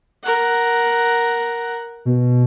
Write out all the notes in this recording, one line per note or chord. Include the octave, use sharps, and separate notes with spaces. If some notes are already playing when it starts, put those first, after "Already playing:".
A#4 F#5
B2